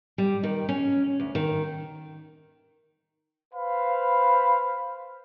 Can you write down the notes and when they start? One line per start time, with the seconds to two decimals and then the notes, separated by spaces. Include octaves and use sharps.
0.18 G3
0.44 D#3
0.69 C#4
1.20 D2
1.35 D#3
3.54 B4 C5 F5 B5